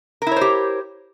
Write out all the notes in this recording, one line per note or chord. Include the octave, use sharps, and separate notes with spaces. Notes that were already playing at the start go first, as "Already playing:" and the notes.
E4 G4 A#4 C5 C#5